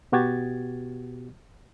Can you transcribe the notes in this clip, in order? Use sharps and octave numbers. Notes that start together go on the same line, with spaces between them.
B2 B3 F#4 G4 G#6 A6